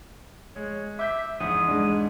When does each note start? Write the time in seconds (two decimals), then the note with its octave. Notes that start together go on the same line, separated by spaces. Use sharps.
0.56 G#3 C#5
0.99 E5 D6 G6 B6
1.40 E2 G#2 D#6
1.68 G#3 D4